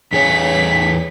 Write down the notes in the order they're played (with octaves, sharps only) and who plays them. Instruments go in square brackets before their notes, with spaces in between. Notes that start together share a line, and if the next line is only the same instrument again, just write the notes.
[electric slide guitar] E2 G#4 C#5 [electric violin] B6